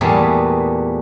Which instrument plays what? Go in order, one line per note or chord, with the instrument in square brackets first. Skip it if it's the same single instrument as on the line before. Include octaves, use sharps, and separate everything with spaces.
[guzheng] E2 A#2 G3 A3 G#4 B4